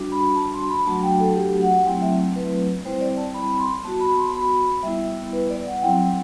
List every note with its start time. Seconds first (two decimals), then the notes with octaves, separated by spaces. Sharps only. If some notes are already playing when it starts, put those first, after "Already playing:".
Already playing: G3 D4 F#4
0.12 B5
0.36 A5
0.54 C6
0.70 B5
0.86 F#3 A3 D4 F#4 A5
1.03 G5
1.20 A4
1.36 G4
1.61 F#5
1.86 F#3 A3 C4 E4 G5
2.02 E5
2.36 B4
2.85 G3 C4 E4 C5
3.01 D5
3.17 A5
3.34 B5
3.59 C6
3.84 B3 F#4 A5
4.00 B5
4.18 C6
4.34 B5
4.83 G3 B3 E4 E5
5.33 B4
5.50 D5
5.67 F#5
5.83 F#3 C4 E4 G5